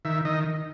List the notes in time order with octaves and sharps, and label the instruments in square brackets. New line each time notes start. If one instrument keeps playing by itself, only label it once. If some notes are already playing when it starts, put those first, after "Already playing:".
[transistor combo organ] D#3 E5
D#3 D#5